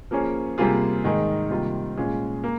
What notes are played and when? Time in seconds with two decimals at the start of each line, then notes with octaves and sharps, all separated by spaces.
0.11 F3 A#3 C#4 G#4 C#5
0.58 C3 G3 A#3 F4 G#4
1.04 G#2 D#3 G#3 D#4 A#4
1.51 C3 D#3 G3 A#3 F4
1.97 A#2 G#3 C#4 G#4
2.44 A#3